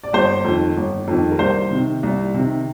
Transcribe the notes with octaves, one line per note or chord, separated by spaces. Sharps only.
D5
G1 C5
F2 D#3
G1
F2 D#3
A#4
C2 C5
C3 D#3
C2
C3 D#3